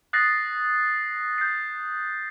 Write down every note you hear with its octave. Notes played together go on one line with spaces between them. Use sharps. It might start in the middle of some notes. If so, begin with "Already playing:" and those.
D#6 F#6 A6 A#6 C7
G6 C7